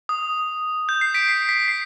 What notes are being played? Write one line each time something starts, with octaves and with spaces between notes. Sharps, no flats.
D#6
G6
C7
B6 D7
C7
B6
C7